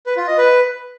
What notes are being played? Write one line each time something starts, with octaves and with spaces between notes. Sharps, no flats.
B4
F4
D#5
B4